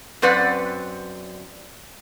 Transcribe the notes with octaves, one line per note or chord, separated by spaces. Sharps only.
F#2 C4 B4 D5 F#5